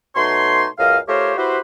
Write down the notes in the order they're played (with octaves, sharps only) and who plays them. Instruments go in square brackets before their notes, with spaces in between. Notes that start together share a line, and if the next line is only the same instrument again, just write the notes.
[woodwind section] B2 A3 D#4 C#5 C6
C#2 F#2 D#5 F5
A3 F4 G4 A#4 C5 C#5
E4 F#4 G4 B4 C5